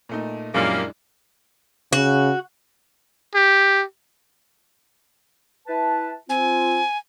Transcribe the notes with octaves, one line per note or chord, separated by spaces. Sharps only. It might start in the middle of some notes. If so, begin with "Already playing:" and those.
A#2 A3 D#4
F#2 A#2 C#3 G3 G#3 A#3 D4 E4
C#3 F#4
G4
E4 B4 A5
C4 F4 G#5